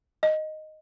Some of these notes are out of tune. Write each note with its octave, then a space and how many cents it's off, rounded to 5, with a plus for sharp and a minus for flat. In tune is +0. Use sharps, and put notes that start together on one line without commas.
D#5 -5